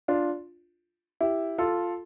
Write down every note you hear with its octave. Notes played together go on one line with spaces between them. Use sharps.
D4 F4
E4 G4
F4 A4